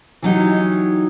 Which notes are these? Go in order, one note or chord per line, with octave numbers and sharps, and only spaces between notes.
E3 F#3 D#4 G4